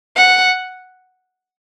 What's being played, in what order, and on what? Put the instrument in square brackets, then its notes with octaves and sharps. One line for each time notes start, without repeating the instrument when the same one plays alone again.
[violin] F#5